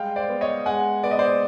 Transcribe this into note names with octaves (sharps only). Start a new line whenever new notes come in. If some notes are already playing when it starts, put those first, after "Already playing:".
Already playing: G3 G#3 F5 G5
C5 D5
B3
C#5 D#5
G#3 F#5 G#5
B3 D5
D#5
C5 D5